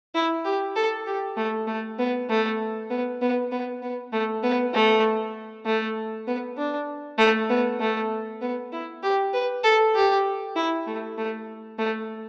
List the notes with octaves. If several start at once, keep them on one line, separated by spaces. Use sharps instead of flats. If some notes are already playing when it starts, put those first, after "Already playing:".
E4
G4
A4
G4
A3
A3
B3
A3
B3
B3
B3
B3
A3
B3
A3
A3
B3
D4
A3
B3
A3
B3
E4
G4
B4
A4
G4
E4
A3
A3
A3